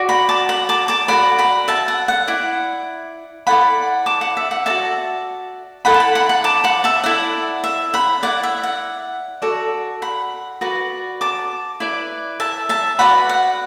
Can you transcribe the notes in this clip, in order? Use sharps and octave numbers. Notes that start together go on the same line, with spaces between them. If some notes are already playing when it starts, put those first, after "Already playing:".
Already playing: F#4 D5
F#5 B5
A5 D6
F#5 B5
A5 D6
A5 D6
F#4 A4 D5 F#5 B5
F#5 B5
E5 A5
F#5
F#5
E4 D5
E4 A4 D5 F#5 B5
A5 D6
F#5
E5
F#5
F#4 A4 D5 E5 A5
E4 A4 D5 F#5 B5
A5
F#5
F#5 B5
F#5 B5
A5 D6
F#5 B5
E5 A5
E4 A4 D5 F#5
E5
F#5 B5
E4 D5 F#5
E5
F#5
F#4 A4 D5
F#5 B5
F#4 B4 D5
A5 D6
E4 B4 D5
E5 A5
E5 A5
F#4 B4 D5 F#5 B5
F#5